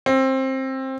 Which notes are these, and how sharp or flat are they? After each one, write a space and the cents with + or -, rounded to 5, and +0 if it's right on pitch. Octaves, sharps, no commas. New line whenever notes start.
C4 +20